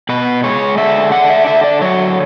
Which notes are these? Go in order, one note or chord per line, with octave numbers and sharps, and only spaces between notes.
B2 B4
G#3 C#5
D3 E5
D4 F#5
E5
D3 E5
D5
F#3 C#5